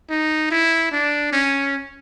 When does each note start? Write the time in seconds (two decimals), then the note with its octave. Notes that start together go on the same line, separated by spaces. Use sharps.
0.10 D#4
0.51 E4
0.92 D4
1.33 C#4